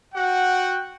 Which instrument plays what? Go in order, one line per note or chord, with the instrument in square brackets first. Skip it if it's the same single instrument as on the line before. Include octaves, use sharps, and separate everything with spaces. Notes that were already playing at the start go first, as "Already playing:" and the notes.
[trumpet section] F#4 F#5 G5